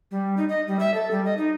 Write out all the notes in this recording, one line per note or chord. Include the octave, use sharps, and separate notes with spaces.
G3
D#4
D#5
G3
E5
A4
G3
D#5
D#4